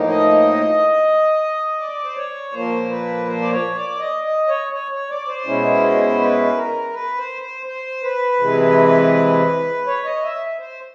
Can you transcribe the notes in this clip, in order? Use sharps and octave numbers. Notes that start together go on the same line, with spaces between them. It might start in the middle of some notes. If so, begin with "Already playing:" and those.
Already playing: A2 F3 A#3 D#4
D#5
D5
C5
C#5
A#2 F3 A#3 C5
B4
C5
D5
C#5
D5
D#5
D#5
C#5
C#5
C#5
D5
C5
B2 G#3 C#4 E4
B4
A#4
B4
C5
C5
C5
B4
C3 E3 G#3
C#5
D#5
E5
C5